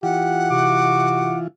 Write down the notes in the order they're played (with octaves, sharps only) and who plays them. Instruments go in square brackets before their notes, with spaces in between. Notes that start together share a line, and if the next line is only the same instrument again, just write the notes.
[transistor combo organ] E3 F4 [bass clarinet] G4 [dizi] F#5
[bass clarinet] C3 [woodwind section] F#4 D6